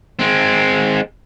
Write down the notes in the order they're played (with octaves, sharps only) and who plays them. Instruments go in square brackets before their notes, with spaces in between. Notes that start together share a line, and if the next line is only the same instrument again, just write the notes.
[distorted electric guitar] G#3 C4